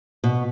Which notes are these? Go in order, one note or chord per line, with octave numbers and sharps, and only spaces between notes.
B2